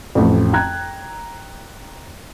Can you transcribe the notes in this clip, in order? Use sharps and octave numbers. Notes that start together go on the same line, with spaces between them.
A1 F2
G5 A#5 F#6 G#6